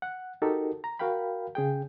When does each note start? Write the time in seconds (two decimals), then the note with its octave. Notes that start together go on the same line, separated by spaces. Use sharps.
0.02 F#5
0.42 D#4 F#4 G4 A4 A#4
0.84 A#5
0.99 F#4 A#4 F5 G5 B5
1.55 C#3 G#4 G5